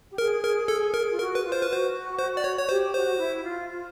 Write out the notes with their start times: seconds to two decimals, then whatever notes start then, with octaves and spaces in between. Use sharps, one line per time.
0.10 G4
0.18 G#4 A#4
0.43 A#4
0.68 A4
0.94 A#4
1.10 F4
1.18 F#4 A#4
1.35 B4
1.44 F4
1.52 C5
1.62 B4
1.69 F#4 C5
2.19 C5
2.37 D5
2.44 C#5
2.58 C#5
2.68 G4 C5
2.94 F#4 C5
3.19 E4
3.44 F4
3.70 F4